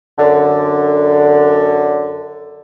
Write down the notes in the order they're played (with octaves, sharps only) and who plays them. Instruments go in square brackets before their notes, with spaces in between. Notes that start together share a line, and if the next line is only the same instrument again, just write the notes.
[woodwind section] F#2 D3